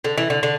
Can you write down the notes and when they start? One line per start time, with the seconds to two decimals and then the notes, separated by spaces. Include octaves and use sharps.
0.04 D3
0.17 E3
0.30 D3
0.43 D3